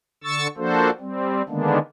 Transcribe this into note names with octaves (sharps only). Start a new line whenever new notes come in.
D3 C#6 E6 A6
F3 A#3 D4 F#4 A4 C5
G3 C4
D3 D#3 G#3 A#3 B3 D4